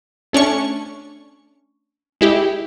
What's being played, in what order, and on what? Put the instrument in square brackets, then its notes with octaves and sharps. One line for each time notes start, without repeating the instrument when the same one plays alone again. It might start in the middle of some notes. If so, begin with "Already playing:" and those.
[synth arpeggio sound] A3 C#4 D4 C#6
G#3 E4 G4